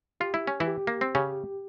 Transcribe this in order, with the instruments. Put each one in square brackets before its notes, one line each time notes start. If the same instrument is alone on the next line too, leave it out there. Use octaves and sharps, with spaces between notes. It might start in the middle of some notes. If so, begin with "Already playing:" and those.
[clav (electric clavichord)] F4 [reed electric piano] G4
[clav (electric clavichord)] E4
C#4
E3 E4
[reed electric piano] G4
[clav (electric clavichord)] A#3
C4
[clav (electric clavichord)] C#3 C#4 [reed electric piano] G4